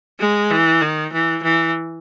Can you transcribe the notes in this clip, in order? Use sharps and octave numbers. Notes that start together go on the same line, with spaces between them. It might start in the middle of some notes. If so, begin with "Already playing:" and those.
G#3
E3
D#3
E3
E3